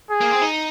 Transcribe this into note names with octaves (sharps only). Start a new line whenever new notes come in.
G#4
A#3
C4
D#4